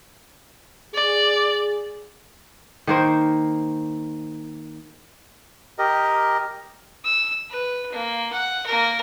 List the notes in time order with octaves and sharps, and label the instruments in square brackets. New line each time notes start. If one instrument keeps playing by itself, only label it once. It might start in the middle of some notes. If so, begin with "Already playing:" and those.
[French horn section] G#4 [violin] D5
[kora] D#3 A#3 C5
[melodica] G4 A#4 D#5
[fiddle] E6
B4
A#3
F#5
A#3 A#4